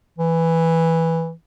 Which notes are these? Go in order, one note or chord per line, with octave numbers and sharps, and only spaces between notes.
E3